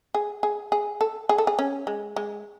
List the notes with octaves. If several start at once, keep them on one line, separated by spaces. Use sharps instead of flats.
G#4
G#4
G#4
A4
G#4
A4
G#4
C#4
G#3
G#3